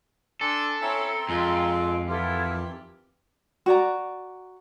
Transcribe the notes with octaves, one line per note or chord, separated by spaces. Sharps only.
D4 A4 G#5 C6 E6
C4 C#4 E4 G5 A#5 C6
F2 G#3 C4 F4
D#3 E3 E4 F4 G4 A4 F#5
F#4 D5 A#5